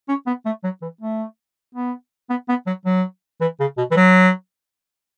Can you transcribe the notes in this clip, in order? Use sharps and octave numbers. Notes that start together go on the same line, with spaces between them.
C#4
B3
A3
F#3
E3
A3
B3
B3
B3
F#3
F#3
E3
C#3
B2
E3
F#3